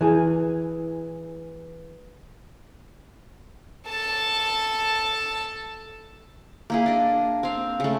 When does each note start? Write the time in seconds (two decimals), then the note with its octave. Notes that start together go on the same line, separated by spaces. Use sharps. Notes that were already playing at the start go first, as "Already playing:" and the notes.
0.01 E3 G#4
3.89 A4 A5
6.70 A#3 E4 G#4
6.86 D4 D#5
7.43 C4 F5
7.80 C#3 A3